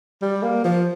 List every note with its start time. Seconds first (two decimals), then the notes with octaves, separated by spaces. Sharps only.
0.22 G3
0.42 A#3
0.64 F3